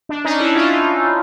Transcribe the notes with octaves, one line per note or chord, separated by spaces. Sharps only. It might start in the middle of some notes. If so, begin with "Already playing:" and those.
D4
C#4 D#4
D4 E4
D#4 F4